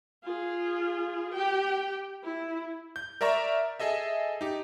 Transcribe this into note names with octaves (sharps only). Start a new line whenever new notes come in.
F4 G#4
G4 G5
E4
G6
A#4 D5 E5 A#5 C#6
G#4 A4 D#5 E5
D#4 G4